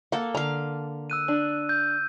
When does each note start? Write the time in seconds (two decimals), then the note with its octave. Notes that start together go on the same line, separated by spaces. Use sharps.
0.12 A#3 A4 F#5
0.35 D3 F5 A#5
1.10 E6 F#6 D#7
1.28 D4
1.69 G6